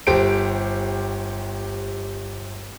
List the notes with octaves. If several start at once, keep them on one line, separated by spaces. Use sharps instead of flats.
G1 G4 C5 D7